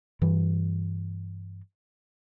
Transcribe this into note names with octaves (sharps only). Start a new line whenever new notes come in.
G2 E3